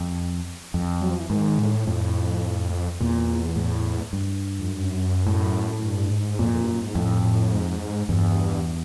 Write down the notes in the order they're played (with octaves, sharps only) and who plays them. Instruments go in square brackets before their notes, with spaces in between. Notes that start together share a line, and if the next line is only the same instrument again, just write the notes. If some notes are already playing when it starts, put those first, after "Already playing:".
Already playing: [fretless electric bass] F2
F2
[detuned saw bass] F#3
F3
E3
[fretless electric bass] G#2 [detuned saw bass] D#3
[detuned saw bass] A2
[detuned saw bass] F2 [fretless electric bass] A2
[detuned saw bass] E2 [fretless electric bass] A#2
[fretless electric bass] A2
G2
[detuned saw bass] F2
F#2
[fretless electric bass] A2
[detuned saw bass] G2
G#2
[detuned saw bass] F2 [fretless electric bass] A#2
[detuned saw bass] F2
G2
F#2
G#2
[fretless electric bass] F2 [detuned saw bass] A2
[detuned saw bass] A2
G#2
[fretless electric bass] E2 [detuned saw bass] G2